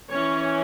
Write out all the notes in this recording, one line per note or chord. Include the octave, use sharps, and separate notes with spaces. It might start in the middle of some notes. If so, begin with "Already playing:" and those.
E3 C#4 C#5